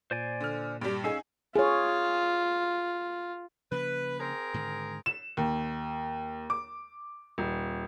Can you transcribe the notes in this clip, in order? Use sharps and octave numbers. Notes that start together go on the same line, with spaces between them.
A#2 C5 D5 G#5
D3 F6
G2 G3 G4
C#4 D#4 G#4 F5 E6
F4 G#4 C#5
C#3 F3 A#3 B4
C4 G#4 A#4
G#2 D3 D#3
E7
D#2
D6
D#1